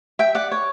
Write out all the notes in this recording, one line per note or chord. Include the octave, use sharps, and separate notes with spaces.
E5 G5
D5 F#5
C#5